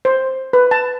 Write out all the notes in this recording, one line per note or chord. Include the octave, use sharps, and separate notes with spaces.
C5
B4
A5